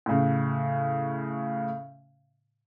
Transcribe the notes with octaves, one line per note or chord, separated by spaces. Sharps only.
A2 C#3